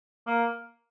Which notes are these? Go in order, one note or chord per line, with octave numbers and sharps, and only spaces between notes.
A#3